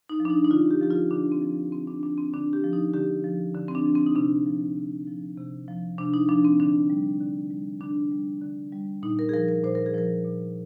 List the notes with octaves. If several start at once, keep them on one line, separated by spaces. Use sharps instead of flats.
D#4
F3
D4
D#4
D#4
D3 F4
G4
F3 G4
F4
D3 D4
C4
F3
D3 C4
D4
F3 D4
C4
D3 D4
G4
F3
D#4
D3 G4
F3
D3
C4
D4
F3
C4
D#4
C3 D4
F3
C3
F3
C3
F3
C3 D4
D#4
F3 D4
C4
D3 D4
G3
D3
G3
D3 D4
G3
D3
G3
A#2 D#4
A#4
G#4
F3 A#4
A#4
A#2 C5
A#4
G#4
F3 A#4
A#2